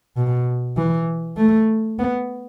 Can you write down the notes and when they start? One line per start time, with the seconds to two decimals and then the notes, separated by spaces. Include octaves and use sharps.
0.16 B2
0.77 E3
1.37 A3
1.99 B3